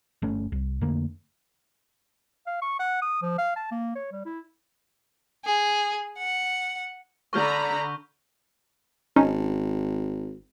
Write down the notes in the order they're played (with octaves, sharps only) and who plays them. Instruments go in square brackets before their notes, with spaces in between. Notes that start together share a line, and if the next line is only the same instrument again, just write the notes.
[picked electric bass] G1 A3 C#4
C2
F2 D3 A3 A#3
[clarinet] F5
C#6
F#5
D#6
F3
F5
A5
A#3
C#5
G3
E4
[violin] G#4
F#5
[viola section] D3 A#5 B5 [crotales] C#6 F6 G6
[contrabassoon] G#1 [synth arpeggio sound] C#4 D#4